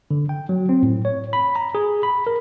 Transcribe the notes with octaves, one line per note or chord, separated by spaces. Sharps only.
D3
G5
F#3
C4
A2
C#5
B5
A#5
G#4
B5
A#4